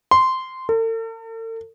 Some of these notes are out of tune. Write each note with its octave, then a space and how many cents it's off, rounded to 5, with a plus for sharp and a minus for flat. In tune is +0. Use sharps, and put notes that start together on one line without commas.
C6 -10
A4 +45